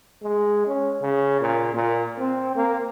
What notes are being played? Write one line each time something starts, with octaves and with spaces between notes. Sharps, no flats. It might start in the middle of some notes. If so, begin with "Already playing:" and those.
G#3
C#4
C#3
A#2
A#2
C4
A#3